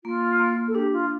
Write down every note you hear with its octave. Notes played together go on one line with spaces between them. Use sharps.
A#3 F4
A#3
A4
D4 G4
F4